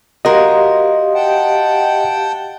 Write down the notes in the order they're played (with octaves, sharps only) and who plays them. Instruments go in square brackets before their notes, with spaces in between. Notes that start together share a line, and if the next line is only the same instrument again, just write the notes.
[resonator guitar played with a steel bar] F#4 A#4 [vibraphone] G4 F5 [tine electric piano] D#5 C6
[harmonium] F#5 G5 A5